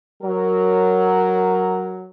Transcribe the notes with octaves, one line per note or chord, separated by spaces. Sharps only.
F#3 A#4